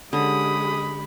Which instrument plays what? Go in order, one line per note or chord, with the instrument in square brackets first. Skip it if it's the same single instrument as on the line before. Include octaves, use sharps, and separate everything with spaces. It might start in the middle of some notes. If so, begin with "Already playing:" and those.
[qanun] D3 C#4 [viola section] G#3 G4 [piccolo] B5 [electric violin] D#6